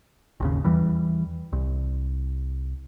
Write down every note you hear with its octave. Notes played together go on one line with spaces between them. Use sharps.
G#1 D#2 C#3
E2 E3 G3
C2